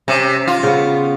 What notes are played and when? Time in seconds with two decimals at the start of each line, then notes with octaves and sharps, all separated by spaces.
0.08 C3 C#4
0.47 F4
0.63 C#3 B3